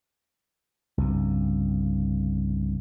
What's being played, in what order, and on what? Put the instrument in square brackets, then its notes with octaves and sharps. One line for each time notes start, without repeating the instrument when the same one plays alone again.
[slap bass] C2 G2 C#3